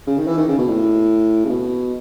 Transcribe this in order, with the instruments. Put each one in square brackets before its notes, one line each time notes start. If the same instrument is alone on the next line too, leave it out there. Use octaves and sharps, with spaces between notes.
[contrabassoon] C#3
D#3
E3
D#3
C#3
B2
A2
C#3
B2